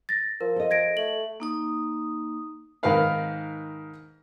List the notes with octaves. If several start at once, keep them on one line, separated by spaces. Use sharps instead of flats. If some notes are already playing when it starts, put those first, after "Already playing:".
A6 A#6
F3 A#4
A4 D#5
G#6 A#6 D7
A3 F#7
A#3 D#4 D#6
G#2 D#3 A#4 B4 F5 B5